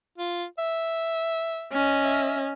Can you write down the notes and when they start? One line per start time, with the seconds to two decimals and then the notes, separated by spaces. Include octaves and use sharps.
0.18 F4
0.58 E5
1.72 C#4 D#5
2.04 E5